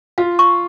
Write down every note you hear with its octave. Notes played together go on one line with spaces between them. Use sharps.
F4 F5
C#6